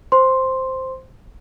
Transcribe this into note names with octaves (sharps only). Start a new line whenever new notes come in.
C5 C6